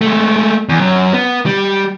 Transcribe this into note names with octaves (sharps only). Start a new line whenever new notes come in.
G#3 A3
E2
F#2
B3
G3